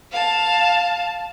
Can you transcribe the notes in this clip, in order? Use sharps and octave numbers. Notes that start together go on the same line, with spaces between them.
F5 A5